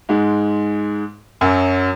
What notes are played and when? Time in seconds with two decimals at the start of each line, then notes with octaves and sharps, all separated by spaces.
0.09 G#2 G#3
1.41 F#2 F#3